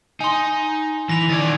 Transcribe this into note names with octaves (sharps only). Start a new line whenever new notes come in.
D#4 G#5 C6
E3 A#6 F7
D#3 D5 G#6 A6